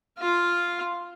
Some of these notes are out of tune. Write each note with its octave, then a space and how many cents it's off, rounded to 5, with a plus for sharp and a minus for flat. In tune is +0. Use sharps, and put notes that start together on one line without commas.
F4 +0 F5 +0